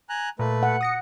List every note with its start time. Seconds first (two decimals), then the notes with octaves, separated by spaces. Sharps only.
0.09 G#5 A#5 F#6
0.39 A#2 A3 B4
0.63 F#5
0.81 D#6 A#6 C#7